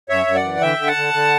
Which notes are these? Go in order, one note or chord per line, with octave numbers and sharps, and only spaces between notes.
F#2 C#5 E5
F#2
D5 F#5
E3
D3 E5 G5
D3
F#5 A5
D3
D3